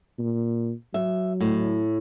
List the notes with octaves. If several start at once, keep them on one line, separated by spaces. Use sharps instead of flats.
A#2
F#3 E5
A2